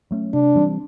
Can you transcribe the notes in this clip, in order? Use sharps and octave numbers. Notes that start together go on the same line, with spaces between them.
F#3 A3 C#4
C3 D4
E3 G3 C4